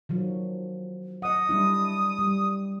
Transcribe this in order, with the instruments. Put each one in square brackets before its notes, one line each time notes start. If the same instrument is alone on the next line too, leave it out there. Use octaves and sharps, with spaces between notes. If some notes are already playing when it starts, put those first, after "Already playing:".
[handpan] D#3 F3 F#3
[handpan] D#5 F#5 [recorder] D#6
[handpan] G3 D4 E4
G3